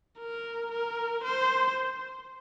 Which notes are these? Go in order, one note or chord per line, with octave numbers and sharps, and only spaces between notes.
A#4
A#4
C5